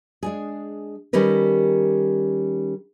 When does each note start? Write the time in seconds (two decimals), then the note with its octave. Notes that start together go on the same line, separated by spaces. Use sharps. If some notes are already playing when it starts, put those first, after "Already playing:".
0.23 G#3 D4 G#4
1.13 D#3 G3 C#4 G4 A#4 B4